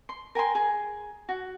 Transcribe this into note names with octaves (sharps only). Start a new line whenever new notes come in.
C6
A#4 G5 G#5 C6
G#4
F#4